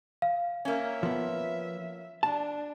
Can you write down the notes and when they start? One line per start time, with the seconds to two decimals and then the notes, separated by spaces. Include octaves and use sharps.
0.22 F5
0.65 A#3 C#4 E5
1.03 F3 B3
2.23 D4 A5